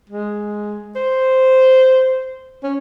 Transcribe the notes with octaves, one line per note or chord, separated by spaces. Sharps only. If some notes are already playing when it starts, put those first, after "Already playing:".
G#3
C5
C#4